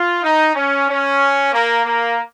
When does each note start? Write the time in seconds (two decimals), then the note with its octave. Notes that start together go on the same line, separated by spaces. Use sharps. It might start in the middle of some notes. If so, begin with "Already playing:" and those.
Already playing: F4
0.23 D#4
0.55 C#4
0.88 C#4
1.52 A#3
1.85 A#3